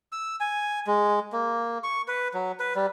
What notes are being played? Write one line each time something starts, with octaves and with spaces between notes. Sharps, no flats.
E6
G#5
G#3
A#3
C#6
B4
F#3
B4
G3